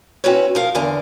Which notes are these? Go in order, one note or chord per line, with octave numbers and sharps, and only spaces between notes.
C4 C#4 E4 F#4 B4 C#5
F3 A#4 F5
E2 D3 A#4 G#5